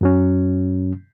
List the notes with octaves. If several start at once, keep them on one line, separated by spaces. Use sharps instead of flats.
F#2 F#3 C#4